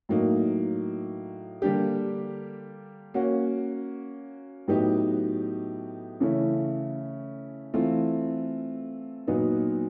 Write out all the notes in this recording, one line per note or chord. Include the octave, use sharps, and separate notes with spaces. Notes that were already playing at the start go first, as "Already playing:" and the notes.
A2 F#3 A#3 D#4
D3 G3 A#3 D4 G4
A#3 C#4 F#4
A2 F#3 B3 D#4 G4
C#3 E3 A3 C#4 E4
E3 A3 C4 F4
A#2 F#3 B3 D#4